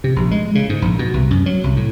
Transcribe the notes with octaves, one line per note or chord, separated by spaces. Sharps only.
C3
A#1
G#3
C#3
G#2
A#1
B2
C2
F#2
F#3
C2
A2